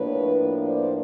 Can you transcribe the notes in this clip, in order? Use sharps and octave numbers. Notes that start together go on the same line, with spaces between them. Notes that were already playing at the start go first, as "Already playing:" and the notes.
Already playing: A2 F3 A#3 D4 B4 C#5
C5 D5